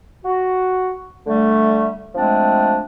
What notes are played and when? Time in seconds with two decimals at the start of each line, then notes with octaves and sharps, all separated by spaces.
0.24 F#4
1.27 D3 G3 A3
2.15 F3 G#3 A3 C4 D4